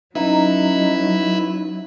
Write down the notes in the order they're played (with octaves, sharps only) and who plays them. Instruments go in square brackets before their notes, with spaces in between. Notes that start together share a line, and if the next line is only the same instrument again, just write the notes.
[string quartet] F#3 [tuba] C#4 [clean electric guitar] D#4 [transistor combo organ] E4 B4